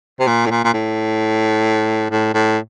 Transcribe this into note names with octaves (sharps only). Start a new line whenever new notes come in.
C3
A#2
A2
A#2
A#2
A2
A2
A2